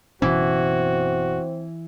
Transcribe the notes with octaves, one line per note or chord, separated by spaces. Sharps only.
F#1 B2 E3 C4 C#4 F#4